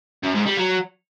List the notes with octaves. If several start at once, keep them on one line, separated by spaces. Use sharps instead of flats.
F#2
G#2
G3
F#3